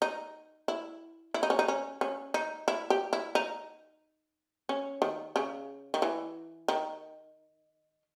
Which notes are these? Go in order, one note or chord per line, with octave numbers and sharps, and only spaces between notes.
D#4
E4
E4
D#4
C#4
D#4
C#4
C#4
D#4
E4
G4
E4
D#4
C#4
D#3
C#3
D#3
E3
D#3